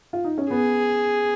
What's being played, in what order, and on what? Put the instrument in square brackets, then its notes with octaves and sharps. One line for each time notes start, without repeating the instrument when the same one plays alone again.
[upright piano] F4
D#4
C#4
[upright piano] B3 [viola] G#4